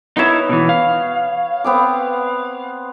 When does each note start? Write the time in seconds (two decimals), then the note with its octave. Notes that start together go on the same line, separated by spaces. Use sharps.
0.17 B3 D#4 E4 C#5 E5
0.49 B2 E3
0.69 F5
1.64 B3 C4 D6